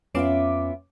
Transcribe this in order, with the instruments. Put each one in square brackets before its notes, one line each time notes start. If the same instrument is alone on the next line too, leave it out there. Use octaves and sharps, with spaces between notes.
[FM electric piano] F2 C#4 D6 [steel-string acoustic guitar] B3 F4 E5